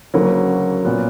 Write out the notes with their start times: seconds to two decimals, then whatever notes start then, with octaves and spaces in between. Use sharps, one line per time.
0.14 D2 C#3 F#3 A#3
0.85 A#2 F#3 B3